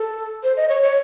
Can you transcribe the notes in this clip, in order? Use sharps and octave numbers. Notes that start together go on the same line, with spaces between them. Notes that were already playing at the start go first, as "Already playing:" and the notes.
Already playing: A4
C5
D#5
C#5
C#5